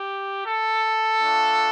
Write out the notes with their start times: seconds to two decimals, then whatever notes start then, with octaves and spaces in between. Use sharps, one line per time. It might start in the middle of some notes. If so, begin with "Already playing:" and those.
Already playing: G4
0.45 A4
1.21 A3 D4 F4